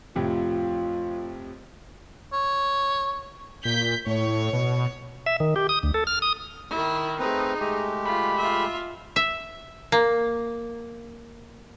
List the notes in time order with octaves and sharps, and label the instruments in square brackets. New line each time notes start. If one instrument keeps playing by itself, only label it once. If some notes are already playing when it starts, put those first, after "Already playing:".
[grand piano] F2 A2 C3 [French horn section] F4
[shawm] C#5
[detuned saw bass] A#2 [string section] G6 B6
[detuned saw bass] A2 [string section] C#5
[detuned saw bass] B2
[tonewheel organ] E5
D#3
G4
D#6
D2
A4
F6
D#6
[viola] D#3 E4
[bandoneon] A3 C4 B4 [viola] D#4 G#4
[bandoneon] G#3 A3 G4
[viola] F4 [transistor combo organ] B5
[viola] F4 E5
[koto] E5
A#3